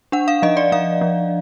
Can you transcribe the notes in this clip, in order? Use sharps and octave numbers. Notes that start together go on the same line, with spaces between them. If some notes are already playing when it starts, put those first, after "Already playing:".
D4 F#5
F5
F3 D#5
D5
F3 F5
F3